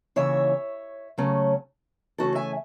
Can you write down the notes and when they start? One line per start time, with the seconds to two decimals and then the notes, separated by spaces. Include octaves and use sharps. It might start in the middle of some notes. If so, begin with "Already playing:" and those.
0.16 D#2 C#3 E3 C#5 E5
1.18 C#3 F#3 A3 C#4
2.18 C#3 E3 A3 C#4 F#4 A4
2.35 E5 G#5